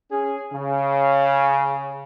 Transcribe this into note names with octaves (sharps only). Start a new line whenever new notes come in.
C#4 G#4
C#3